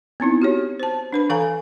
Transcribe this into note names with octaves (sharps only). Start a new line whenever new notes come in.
B3 C4 D#4 E4
F#4 G4 C#5
C5 A5
D4 B4 B5
E3 A4 F5 G#5 A#5